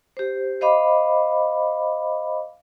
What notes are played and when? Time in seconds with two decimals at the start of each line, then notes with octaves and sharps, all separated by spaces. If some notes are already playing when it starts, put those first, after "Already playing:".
0.17 G4 C5
0.61 C5 D#5 F5 B5 D6